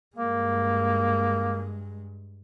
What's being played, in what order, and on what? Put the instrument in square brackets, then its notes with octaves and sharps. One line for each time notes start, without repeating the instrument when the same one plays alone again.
[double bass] G2 G#3 [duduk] A#3